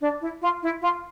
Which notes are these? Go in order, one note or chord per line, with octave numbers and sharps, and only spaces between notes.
D4
E4
F4
E4
F4